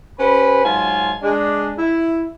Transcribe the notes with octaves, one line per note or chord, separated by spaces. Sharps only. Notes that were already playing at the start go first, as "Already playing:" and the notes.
C#4 G4 B4 C5 B5
G#2 F#3 F4 G#5 A5 C6
G#3 D4
E4